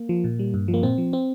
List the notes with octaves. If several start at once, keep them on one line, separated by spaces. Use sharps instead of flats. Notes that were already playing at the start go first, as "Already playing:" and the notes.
Already playing: A#3
F3
A#2
G3
G2
F3
A#3
A#2 C4
F3
C4